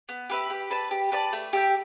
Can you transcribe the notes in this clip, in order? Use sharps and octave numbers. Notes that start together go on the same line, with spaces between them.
B3
G4 B4 E5
G4
B4 D5 A5
G4
B4 D5 A5
A3
G4 E5 G5